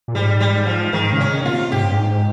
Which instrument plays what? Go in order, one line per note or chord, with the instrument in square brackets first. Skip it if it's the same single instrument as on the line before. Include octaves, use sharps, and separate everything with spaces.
[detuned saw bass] A#2
[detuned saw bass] G#2 [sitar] G3
[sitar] G3
F3
[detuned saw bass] G#2 [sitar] D#3
[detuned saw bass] C#3
[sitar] C#4
[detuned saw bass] D#3
[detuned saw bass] A#2 [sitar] F4
[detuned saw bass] C3
[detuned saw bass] G#2 [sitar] G4
[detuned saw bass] G2
G#2